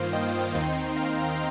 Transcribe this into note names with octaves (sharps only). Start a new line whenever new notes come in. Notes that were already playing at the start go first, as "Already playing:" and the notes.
Already playing: G2 D#3 A#3 F4 C5 F5
D#5 G5
D#2 D#3 C4 D#4 G5 C6
F5 A#5